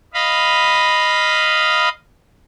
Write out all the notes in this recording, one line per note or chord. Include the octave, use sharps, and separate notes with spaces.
D#5 F5 B5